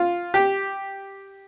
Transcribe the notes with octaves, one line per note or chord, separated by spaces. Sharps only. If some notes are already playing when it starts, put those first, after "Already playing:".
Already playing: F4
G4